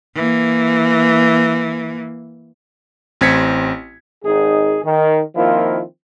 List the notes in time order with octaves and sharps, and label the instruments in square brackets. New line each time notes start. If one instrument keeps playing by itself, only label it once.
[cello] E3 A#3
[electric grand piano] A1 C4 G#6 B6 C#7
[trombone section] G#1 D#4 G#4
D#3
D#3 F3 A#3 C4 E4 F4